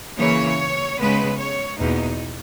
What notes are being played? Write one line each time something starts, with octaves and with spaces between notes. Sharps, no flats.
C#3 E3 A#3 C#5
C#3 G#3 B3 B4
C#5
E2 B2 A#3 D#4